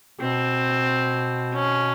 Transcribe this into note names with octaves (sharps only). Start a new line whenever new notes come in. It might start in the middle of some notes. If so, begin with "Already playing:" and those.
B2 C4
C#4